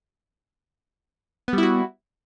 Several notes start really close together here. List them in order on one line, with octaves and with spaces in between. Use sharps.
B3 G3 E4 F#4